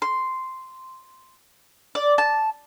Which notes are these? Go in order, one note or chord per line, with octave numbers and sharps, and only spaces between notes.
C6
D5
A5